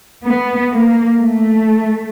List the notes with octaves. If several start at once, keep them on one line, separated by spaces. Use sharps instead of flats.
B3
A#3
A3